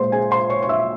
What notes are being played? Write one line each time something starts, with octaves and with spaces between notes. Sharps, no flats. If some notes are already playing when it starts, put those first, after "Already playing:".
Already playing: A#2 G#3 C5 C6
G#4 G#5
C5 C6
C#5 C#6
C#6
E5 E6